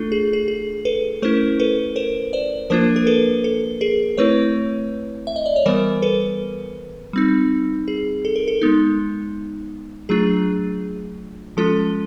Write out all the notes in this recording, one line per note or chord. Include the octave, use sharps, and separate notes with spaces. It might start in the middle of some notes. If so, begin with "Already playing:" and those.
Already playing: A3 D4 F4 A4
G#4
G#4
G#4
A4 B4
A3 C#4 E4 A#4 C5
A4 B4
A#4 C5
C5 D5
F3 A#3 D4 F4 A#4 C5
A#4
A4 B4
A4
G#4 A#4
A3 C4 E4 B4 C#5
E5
D#5
D5
C#5
E3 G3 B3 A#4 C5
A4 B4
G3 C4 D#4
G#4
A4
A#4
A4
G#3 B3 D#4
F#3 A3 D4 F4 G#4
F3 G#3 C#4 F4 A4